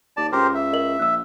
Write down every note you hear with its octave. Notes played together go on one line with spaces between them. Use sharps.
D#2 D5 A5
C#2 G4 A#4 C5
E5
A#4 D#5 F#7
A#1 E6 F#6